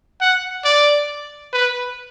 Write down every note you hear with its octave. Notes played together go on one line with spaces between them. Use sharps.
F#5
D5
B4